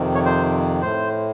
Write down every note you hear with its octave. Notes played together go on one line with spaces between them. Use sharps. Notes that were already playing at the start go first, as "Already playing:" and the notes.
Already playing: F2 C3 D#3
C#5
C5
A2 C5